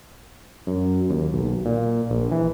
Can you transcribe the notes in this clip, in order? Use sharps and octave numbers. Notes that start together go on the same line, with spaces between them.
F#2
D#2
B1
A#2
A#1
E3